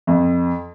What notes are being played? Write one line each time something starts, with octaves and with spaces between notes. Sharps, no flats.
F2